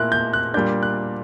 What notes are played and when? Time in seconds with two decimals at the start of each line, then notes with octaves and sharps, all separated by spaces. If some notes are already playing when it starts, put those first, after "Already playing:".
Already playing: A#2 A#3 E4 F#6
0.12 G6
0.33 F#6
0.54 A#2 G3 A#3 D4 G6
0.83 F#6